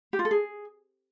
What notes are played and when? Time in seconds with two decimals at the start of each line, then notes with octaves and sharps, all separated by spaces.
0.13 G4
0.19 F4
0.25 A4
0.31 G#4